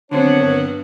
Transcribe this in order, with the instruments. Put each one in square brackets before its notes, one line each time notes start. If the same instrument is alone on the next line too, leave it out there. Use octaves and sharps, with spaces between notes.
[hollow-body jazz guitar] D3 C4 [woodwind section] D#3 C#5 [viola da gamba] F#3 B3 [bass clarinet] D4
[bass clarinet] G2